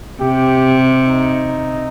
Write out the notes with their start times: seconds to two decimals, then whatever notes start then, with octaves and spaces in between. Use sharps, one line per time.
0.21 C3 G4
1.07 D#4